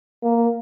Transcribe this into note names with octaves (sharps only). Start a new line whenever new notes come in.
A#3